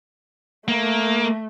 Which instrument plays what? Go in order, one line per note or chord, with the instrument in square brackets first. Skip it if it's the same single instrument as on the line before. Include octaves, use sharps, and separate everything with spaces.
[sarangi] A3 [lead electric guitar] A#3